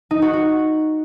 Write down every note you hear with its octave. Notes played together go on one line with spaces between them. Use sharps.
D#4
F#4
F#4